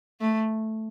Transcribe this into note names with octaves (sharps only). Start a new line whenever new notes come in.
A3